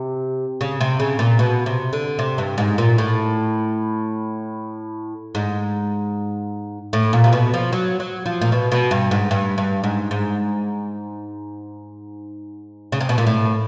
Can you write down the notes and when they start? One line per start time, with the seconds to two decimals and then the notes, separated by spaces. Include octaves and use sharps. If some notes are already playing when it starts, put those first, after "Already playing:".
Already playing: C3
0.61 C#3
0.81 C3
1.00 C#3
1.19 A#2
1.39 B2
1.66 C3
1.93 D3
2.19 C3
2.38 G2
2.58 G#2
2.78 A#2
2.98 A2
5.35 G#2
6.93 A2
7.13 A#2
7.24 C3
7.33 B2
7.54 F3
7.73 F#3
8.00 F#3
8.26 F3
8.41 A#2
8.52 B2
8.72 B2
8.91 G2
9.11 G#2
9.31 G2
9.58 G2
9.83 G#2
10.11 G#2
12.92 C#3
13.00 C3
13.09 B2
13.18 A#2
13.27 A2